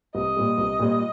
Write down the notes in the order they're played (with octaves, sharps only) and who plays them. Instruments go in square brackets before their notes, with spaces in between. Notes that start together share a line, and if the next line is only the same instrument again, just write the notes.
[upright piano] C2 [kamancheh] D#5
[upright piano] A#2 G3
C2
A#2 G3